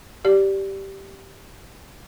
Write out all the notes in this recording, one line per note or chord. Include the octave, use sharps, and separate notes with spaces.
G4 D5